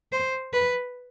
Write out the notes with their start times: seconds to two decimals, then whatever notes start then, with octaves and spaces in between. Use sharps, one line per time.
0.12 C5
0.53 B4